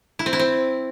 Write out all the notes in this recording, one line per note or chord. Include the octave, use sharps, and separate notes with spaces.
E4
C4
E4
C4